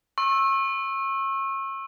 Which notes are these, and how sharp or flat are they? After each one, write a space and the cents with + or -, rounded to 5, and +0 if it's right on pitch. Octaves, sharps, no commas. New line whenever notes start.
C#6 -35 E6 +0